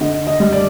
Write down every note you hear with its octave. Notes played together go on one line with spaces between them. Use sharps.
D3 D#5
D#5
G3
D5